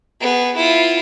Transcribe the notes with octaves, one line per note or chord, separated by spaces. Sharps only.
B3 G#4
E4 F4